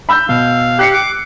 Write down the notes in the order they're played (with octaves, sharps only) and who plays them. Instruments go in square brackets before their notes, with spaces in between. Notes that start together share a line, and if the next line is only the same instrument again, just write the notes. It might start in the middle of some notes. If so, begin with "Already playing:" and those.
[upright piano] B5 E6 G6
[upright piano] B2 [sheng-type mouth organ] F5
[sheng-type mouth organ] G4 [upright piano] F#6 C7 C#7
[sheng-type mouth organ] D6